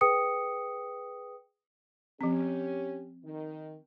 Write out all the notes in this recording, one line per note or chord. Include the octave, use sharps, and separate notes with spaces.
G#4 B4 G5 D#6 C#7
F3 C4 C#4 G4
D#3